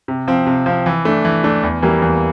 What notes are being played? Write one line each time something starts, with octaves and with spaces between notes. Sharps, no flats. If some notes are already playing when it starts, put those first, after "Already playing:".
C3
F3 C4
C3
F3 C4
E3
A3 D4
E3
A3 D4
E2
E3 G3 A#3
E2